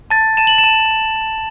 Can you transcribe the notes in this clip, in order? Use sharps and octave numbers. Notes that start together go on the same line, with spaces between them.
A5 A6
A5 E7
F#7
E7
A5